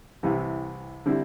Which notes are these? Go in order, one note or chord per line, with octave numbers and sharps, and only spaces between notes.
C2 C3 E3
D3 G3 C4 E4